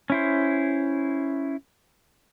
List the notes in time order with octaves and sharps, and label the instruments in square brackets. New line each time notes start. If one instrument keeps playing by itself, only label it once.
[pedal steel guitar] C#4 E4 C5